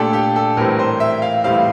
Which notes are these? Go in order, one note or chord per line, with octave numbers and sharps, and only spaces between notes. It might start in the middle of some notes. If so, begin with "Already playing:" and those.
Already playing: A#2 A3 D4 G4 A4 D5
G4
A4
A2 E3 G3 C4 A#4
C5
E5
F5
A2 E3 G3 C4 F5